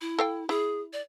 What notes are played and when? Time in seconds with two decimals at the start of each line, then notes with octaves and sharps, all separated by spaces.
0.01 E4
0.19 A4 F5 G5
0.49 E4 G#4
0.93 D5